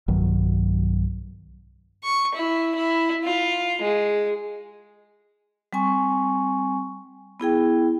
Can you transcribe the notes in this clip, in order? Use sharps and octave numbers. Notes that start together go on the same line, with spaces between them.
B1 G2 D#3 F#3
C#6
E4
E4
F4
G#3
G3 C4 G#5 C#6
B3 E4 G#4 G5